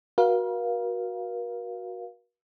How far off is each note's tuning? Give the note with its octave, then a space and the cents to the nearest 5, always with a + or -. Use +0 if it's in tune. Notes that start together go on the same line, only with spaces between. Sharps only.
F#4 +0 A#4 +45 F5 +0